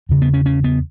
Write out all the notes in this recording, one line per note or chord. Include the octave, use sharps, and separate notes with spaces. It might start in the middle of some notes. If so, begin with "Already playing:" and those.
E2 C#3
B3
C#4
C#4
B3